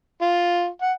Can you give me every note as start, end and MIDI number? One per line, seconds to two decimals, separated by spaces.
0.22 0.67 65
0.82 0.92 78